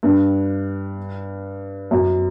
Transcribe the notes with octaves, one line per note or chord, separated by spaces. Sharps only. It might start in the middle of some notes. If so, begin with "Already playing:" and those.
G2
F#2